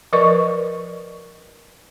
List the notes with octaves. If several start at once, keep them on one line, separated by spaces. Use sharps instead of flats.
F3 A#4 B4 D5 D#5 C#6